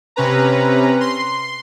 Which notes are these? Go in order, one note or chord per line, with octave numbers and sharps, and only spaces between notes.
C3 C#4 B4 A#5
C6